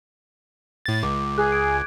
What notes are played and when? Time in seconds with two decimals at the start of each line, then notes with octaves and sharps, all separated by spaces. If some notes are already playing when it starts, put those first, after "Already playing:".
0.86 A2 A6
1.03 C#2 D6
1.38 G#4 F#6 G#6
1.52 G#6 D7